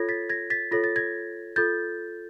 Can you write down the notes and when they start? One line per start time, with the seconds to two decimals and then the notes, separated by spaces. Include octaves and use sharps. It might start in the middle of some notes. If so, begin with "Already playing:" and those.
Already playing: F4 A4 C#5 G#6 A#6
0.09 A6 B6
0.30 G#6 A#6
0.50 A6 B6
0.71 F4 A4 C#5 A#6
0.84 A6
0.96 G#6 A#6
1.56 F4 A4 G6 A6